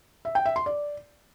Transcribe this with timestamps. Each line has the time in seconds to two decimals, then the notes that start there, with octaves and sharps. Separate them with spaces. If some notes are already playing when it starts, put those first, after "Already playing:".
0.25 E5
0.35 G5
0.46 E5
0.56 C6
0.66 D5